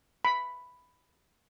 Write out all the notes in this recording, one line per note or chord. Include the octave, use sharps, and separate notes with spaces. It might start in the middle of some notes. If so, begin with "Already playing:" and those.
B5